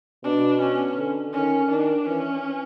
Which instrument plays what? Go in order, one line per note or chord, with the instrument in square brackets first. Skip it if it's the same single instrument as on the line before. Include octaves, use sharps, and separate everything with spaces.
[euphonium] B2 [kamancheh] D4
[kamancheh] C#4
[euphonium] D3
[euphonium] D#3 [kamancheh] C#4
[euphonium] D#3 [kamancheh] D4
[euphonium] E3 [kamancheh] C#4